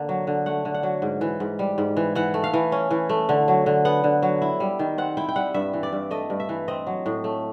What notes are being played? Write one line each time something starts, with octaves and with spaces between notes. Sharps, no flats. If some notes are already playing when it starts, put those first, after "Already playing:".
Already playing: D3 A#3
F#3
D3
A3 F#5
D3
F#5
F#3
G#2
E3
G#2
G3
G#2
E3
E3 F#5
A3
F5
E3
C#4
E3
A3
D3
F#3
D3
B3 F#5
D3
F#3
E4
G3
D#3
C4 F#5
E4 G5
G5
G3 F#5
G2 E5
E3
D5
G2
A3 D#5
G2
E5
E3
C4 D#5
F#3
A2
A3